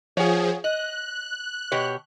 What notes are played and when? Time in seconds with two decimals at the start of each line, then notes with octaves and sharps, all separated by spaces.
0.17 F3 G#4 C#5 F#5
0.64 D#5 F#6
1.72 B2 G4 C#5